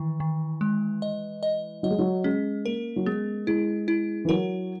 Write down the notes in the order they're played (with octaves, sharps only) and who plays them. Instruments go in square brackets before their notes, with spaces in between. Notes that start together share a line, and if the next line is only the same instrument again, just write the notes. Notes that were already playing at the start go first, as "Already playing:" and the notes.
Already playing: [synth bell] D#3 [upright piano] E3
[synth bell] D#3
G#3
D#5
D#5
[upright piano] F#3 [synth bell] D#5
[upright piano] G#3
F#3
[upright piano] G#3 [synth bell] C#4
[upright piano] A#3 [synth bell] A#4
[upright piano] F#3
[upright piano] G#3 [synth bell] B3
[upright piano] G#3 [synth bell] E4
[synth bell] E4
[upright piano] E3
[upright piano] F#3 [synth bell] A#4